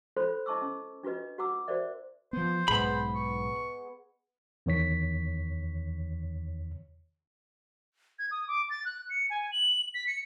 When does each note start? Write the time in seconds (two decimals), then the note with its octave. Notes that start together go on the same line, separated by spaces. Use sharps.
0.17 F4 A4 C5 C#5 B5 C6
0.46 E4 D#5 A5 C#6 D6 E6
0.62 C#4
1.03 D4 F4 F#4 B4 D#5
1.38 F#4 F#5 A#5 D6 E6
1.68 F#4 A#4 C5 D5 E5
2.33 F3 B3 C5
2.68 B1 G#2 G#3 B3 B5
3.15 C#6
4.66 E2 D#3 C#5 B6
8.19 G#6
8.31 D#6
8.48 D6
8.70 A6
8.85 F#6
9.10 C#7
9.30 G#5
9.52 F#7
9.94 B6
10.07 C#7